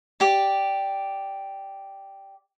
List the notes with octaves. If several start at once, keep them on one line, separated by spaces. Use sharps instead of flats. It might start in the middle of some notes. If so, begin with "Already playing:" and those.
G4 D5